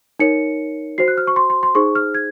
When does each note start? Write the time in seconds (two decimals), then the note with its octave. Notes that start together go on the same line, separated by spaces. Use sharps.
0.19 D#4 A#4 C#5 C#7
0.98 F#4 C5 C7
1.08 F#6
1.18 F6
1.27 C#6
1.36 C6
1.50 C6
1.63 C6
1.75 D#4 G#4 C5 C#6
1.95 F6
2.14 G#6